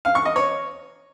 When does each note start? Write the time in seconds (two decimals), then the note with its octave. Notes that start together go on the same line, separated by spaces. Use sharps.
0.05 F5
0.15 C#6
0.25 D#5
0.36 C#5